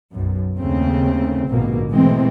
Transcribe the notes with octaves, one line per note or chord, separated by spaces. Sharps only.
B1 F#2
D#2 C#3 A3 C4
A#1 G#2 B2 D3 A#3
B2 E3 G#3 A3 C4